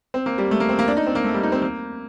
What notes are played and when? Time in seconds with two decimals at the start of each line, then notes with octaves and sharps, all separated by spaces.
0.14 C4
0.26 A#3
0.38 G3
0.51 A3
0.60 A#3
0.69 C4
0.79 A#3
0.88 D4
0.97 D#4
1.07 C4
1.15 A#3
1.24 A3
1.34 G3
1.43 D#4
1.52 C4
1.62 A#3